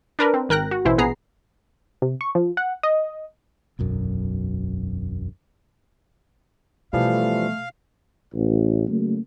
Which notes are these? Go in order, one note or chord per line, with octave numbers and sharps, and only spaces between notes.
D4 A#4 B4
C4
G#1 A#4 G5 F#6 A#6
F#4
A1 B2 E3 E4 C5
A#1 B3 G#4 A#5 C7
C3
C#6
F3
F#5
D#5
E1 B1 F#2
B2 E3 F3 G3 A3 F5
A1
C#3 F#3 A3 A#3